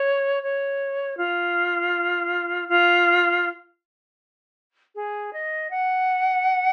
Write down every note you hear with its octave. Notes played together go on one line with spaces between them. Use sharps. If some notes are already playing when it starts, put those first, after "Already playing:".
Already playing: C#5
C#5
F4
F4
G#4
D#5
F#5